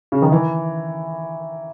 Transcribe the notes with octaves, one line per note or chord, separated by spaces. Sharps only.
C#3
D#3
E3